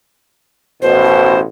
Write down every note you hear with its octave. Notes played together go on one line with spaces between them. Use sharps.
A1 B2 C5